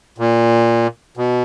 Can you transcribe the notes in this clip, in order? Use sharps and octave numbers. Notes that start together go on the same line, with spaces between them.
A#2
B2